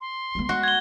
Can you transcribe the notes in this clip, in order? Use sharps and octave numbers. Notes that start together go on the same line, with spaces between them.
C6
G#3 B3
F#4
G#6 G7